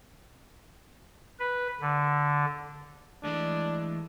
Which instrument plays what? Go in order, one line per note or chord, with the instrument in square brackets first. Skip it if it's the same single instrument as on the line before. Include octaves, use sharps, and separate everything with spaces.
[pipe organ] B4
D3
[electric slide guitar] E3 G#3 A3 [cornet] D4